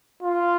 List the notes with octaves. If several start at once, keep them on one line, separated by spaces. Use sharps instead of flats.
F4